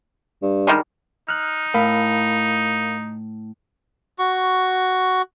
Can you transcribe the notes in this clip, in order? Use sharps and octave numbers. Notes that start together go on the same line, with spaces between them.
G2
D#3 G3 G#3
D#4 F6 F#6
A2 A#4 F5 B5
F#4 C#6